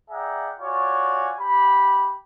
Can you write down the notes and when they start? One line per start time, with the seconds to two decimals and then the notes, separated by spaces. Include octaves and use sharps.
0.10 G#4 D5 E5 F#5 G5 A#5
0.60 F4 F#4 C#5 D5 G#5
1.40 G4 B5